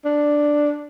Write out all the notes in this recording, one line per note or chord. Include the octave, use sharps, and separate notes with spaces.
D4